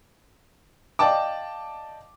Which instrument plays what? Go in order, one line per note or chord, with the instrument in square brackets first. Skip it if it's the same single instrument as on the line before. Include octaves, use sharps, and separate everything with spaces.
[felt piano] D5 D#5 F5 G5 A5 D6